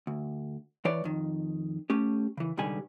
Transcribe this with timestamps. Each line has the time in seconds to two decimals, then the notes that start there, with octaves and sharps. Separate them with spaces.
0.07 D2
0.85 E3 B4 C#5 D5
1.04 F2 D#3
1.90 A3 C#4 G4
2.37 C#3 E3
2.58 C#2 B2 D3 D#3 G3 G#5